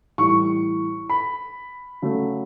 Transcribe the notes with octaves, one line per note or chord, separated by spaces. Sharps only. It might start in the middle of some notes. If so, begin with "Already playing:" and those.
A2 E3 G3 C#6
B5
C#3 F#3 A3